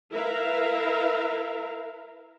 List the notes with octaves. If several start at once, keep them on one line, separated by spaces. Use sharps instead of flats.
E4 A#4 B4 E5 F5 A#5